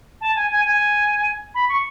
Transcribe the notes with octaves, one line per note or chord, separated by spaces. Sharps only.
A5
G#5
G#5
G#5
B5
C#6